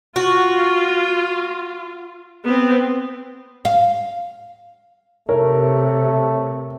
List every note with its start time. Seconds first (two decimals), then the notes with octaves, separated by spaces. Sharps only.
0.16 F4 F#4
2.45 B3 C4
3.65 F5
5.29 C3 A3 A#4 C#5